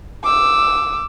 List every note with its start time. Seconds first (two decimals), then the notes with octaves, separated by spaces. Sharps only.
0.24 D6 E6